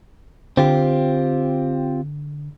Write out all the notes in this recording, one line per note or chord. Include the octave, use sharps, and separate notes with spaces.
D3 C4 F4 G4